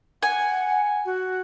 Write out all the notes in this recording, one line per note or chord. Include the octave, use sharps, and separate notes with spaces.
F#5 G#5
F#4